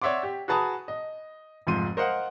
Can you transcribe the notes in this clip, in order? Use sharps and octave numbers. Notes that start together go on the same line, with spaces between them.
C#5 D5 E5 F#5 C6 D6
G4
F#4 G#4 B4 A5 A#5 D#6
D#5
F1 G#2 F3 C6 D#7
A#4 C5 D#5 F5 F#5